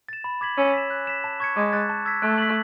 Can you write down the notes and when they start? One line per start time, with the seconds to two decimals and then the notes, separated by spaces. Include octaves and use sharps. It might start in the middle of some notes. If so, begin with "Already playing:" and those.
0.09 A6 E7
0.24 B5
0.41 D6 G#6 B6 F#7
0.57 C#4 E6
0.74 B6 E7
0.90 F#6
1.07 B6 E7
1.24 A5
1.40 C#6 G#6 C#7
1.56 G#3 D6
1.73 F#6 A6
1.89 A5
2.06 E6 G#6 B6
2.22 A3 F#6
2.38 B6 F#7